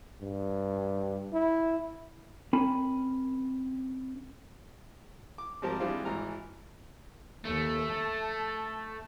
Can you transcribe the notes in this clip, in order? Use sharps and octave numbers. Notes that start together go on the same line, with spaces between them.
G2
E4
C4 C#4 A#4 G#5 B5
D6
G#1 F3 G3 C4 A#4 A5
E3 G3 G#3 C4 D4 F4
G#1 E3 A#5 F6
D#2 A3
A5